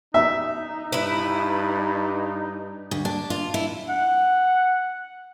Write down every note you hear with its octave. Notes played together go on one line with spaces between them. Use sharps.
D#4 E5
G2 E4 B4
D2
D4
F4
E4
F#5